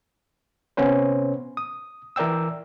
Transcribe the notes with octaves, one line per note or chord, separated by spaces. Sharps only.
C3 B3 C#4 B4 C5
D#6
E3 A#4 D5 G5 E6